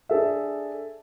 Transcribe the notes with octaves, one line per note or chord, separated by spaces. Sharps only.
D4 G#4 A4 E5